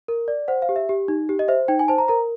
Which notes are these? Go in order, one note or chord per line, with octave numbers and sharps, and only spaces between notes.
A#4
D5
C5 F#5
F5
G4
E5
G4
D#4
G4
D#5
C5 E5
D#4 G5
G#5
C5 A5
A#5
A#4 A#5